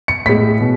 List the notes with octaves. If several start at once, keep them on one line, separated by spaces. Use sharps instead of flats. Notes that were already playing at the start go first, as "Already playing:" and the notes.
C#7
A2 G#3 B6
B2